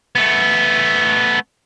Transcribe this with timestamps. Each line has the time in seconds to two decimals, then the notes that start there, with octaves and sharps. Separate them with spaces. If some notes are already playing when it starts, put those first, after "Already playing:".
0.15 A3 B3